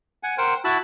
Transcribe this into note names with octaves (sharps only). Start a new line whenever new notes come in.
F#5 G#5
A#4 C5 F#5 G5
E4 F#4 A5 B5 E6